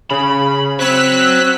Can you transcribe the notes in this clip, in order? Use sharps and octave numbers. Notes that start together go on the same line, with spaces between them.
C#3 B5
C4 F#4 C#5 E6 F#6 B6